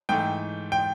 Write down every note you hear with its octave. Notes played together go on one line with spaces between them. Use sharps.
G#2 E3 A3 G5
G5